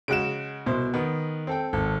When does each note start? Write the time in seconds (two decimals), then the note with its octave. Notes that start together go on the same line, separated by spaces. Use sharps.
0.08 C#3 G#3 F#4 D7 E7
0.66 C2 B2 C5
0.94 D#3 B3
1.47 C4 A4 G5
1.73 G#1 A4